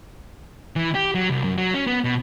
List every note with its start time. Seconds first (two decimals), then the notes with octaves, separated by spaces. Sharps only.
0.76 E3
0.95 G4
1.15 F#3
1.30 C2
1.44 F#2
1.58 F#3
1.74 C#4
1.87 B3
2.04 B2